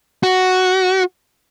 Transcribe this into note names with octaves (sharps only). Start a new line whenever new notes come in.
F#4